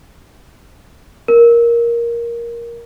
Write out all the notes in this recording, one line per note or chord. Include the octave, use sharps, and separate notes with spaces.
A#4